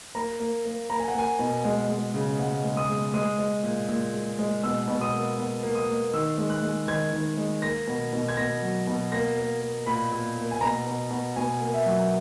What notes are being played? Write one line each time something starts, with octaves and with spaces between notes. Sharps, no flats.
A#3 A#5
A#3
A#3
A#3 A#5
G#5
F#5
A#3 G#5
B2
G#3
G#3
C#3
G#3 F#5
G#3
D#6
G#3
G#3 D#6
G#3
A#2
A#2
G#3
G#3
B2 E6
B2
D#6
A#3
B2
A#3
D#6
A#3
D#3 E6
G#3
F#6
G#3
D#3 G#6
D#3
G#3
A#3 A#6
B2
B2
G#6
B2 A#6
F#3
B2
A#3 A#6
A#3
A#3
A#2 B5
A#2
A#3
G#5
B2 A#5
B2
B2
B2 G#5
A#3
E5
F#3